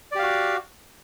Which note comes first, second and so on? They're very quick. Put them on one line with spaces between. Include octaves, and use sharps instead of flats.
D5 G4 F5 F#4